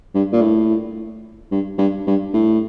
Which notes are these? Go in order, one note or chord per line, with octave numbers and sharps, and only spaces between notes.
G2
A#2
A2
G2
G2
G2
A2